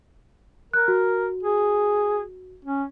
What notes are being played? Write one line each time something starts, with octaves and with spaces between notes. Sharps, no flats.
A#4 F#6
F#4
G#4
C#4